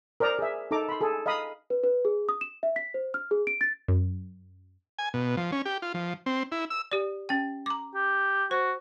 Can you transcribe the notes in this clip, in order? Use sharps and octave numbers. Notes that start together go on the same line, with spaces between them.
A#4 C5 D5 A#5 D#6
G#4 E5
D#4 A4 A#5 D6
B5 C6
G#4 A4
D#5 F5 A#5 B5 D#6
B4
B4
G#4
D#6
E7
E5
B6
C5
F6
G#4
D7
A6
F#2
G#5
B2
F3
C#4
G4
F4
F3
C4
E4
E6
G4 D5
C#4 G5
A#5 D6
G4
F#4 C5